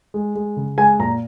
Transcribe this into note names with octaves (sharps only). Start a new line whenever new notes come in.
G#3
G#3
C#3
G#3 G#5
A#2 A#5